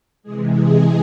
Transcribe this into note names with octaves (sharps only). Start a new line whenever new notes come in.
C3 E3 G#3 G#4
G#4